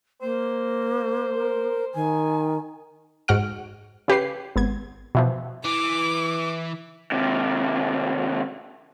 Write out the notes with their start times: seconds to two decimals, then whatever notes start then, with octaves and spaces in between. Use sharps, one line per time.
0.22 A#3 C5
1.35 A#4
1.95 D#3 G#5
3.28 G#2 F#4 F#5 F6 D7
4.08 C#3 G4 B4 C7
4.56 G#1 B3 G#6
5.15 B2 E3 F3
5.65 E3 D6
7.12 D#2 C3